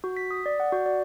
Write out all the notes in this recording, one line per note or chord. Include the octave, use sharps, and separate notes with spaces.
F#4
B6
D#6
D5
F#5
F#4
D5